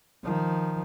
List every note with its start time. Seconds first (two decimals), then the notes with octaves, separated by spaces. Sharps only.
0.23 D#3 F3